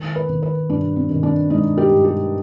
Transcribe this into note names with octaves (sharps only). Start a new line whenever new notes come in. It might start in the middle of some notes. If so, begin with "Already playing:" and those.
Already playing: D#3
B4
D#3
B4
G2 D4
C4
D#3
D4
G#3 D#4
G4
G2
G4